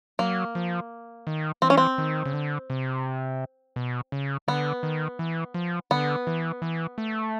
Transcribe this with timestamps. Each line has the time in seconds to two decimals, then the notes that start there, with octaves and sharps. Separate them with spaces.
0.19 F#3 A#3
0.55 F3
1.27 D#3
1.62 E3 C4
1.70 C#4
1.77 C4
1.98 D#3
2.26 C#3
2.33 D3
2.70 C3
3.76 B2
4.12 C#3
4.48 D3 B3
4.83 D#3
5.19 E3
5.54 F3
5.91 D3 B3
6.27 E3
6.62 E3
6.98 A3